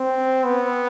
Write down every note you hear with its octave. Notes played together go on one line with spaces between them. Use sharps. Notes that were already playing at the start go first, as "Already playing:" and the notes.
Already playing: C4
B3